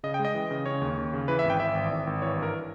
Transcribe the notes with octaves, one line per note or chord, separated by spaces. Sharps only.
C#3 D#5
G5
G#3
D#5
E3
C#3
C#3 C#5
D#2
D#2
C#3
E3 B4
E5
G#1
G5
E3 E5
G#1
G#1
G#1
E3 C#5
G2 A#4